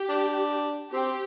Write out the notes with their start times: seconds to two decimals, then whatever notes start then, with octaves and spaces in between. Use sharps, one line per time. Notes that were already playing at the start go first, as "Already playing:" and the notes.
Already playing: G4
0.09 D4
0.93 C4 G4